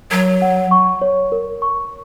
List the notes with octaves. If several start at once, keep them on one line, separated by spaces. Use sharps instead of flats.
F#3 A#4
F#5
C#6
C#5
A#4
C#6